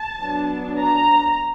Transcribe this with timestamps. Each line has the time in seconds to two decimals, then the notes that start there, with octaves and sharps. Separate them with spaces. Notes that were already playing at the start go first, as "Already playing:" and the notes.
Already playing: A5
0.19 F#3 B3 D4
0.80 A#5